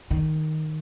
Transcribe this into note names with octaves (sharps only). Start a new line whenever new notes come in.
D#3